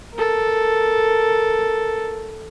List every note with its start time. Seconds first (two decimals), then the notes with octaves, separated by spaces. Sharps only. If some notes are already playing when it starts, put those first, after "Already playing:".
0.14 A4 A#4